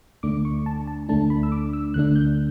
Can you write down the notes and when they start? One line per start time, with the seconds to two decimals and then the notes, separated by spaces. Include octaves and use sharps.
0.23 D2 D3 A3 D4 D6
0.45 C#6
0.66 A5
0.87 A5
1.09 D2 D3 A3 D4 A5
1.30 B5
1.43 E6
1.52 D6
1.73 E6
1.94 D2 D3 A3 D4 F#6
2.16 G6